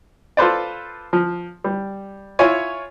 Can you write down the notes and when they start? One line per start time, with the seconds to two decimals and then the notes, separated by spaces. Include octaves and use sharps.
0.37 F4 A4 B4 C5 D5
1.13 F3
1.64 G3
2.39 E4 F4 C#5 G#5